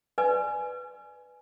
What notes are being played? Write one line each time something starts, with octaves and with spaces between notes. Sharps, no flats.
B4 D5 G#5